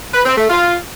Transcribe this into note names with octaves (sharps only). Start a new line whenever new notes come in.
B4
C4
A3
F4